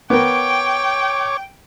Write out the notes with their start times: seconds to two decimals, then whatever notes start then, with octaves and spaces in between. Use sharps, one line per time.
0.10 B3 A#4 C#5 G5 D6